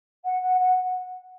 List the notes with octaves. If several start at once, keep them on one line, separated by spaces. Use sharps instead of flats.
F#5
F#5
F#5